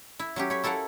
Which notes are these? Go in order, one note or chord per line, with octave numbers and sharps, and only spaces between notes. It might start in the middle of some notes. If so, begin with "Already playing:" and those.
E4
F#3 C#4 G4
C#5 B5
E4 A4 A#4 F5 F#5